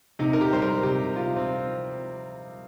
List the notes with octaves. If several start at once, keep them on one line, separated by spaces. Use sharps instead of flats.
C3 D#4
A#4
G4
G3 C5
A#4
C3 G4
C3 F4
C4